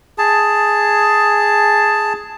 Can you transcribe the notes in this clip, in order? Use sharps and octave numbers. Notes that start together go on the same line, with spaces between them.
G#4 A5